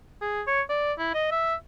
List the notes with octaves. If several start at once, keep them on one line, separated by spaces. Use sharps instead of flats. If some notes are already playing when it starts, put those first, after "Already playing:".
G#4
C#5
D5
E4
D#5
E5